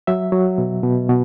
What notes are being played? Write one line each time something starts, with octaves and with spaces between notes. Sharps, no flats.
F#3 E5
F#3
B2
B2
B2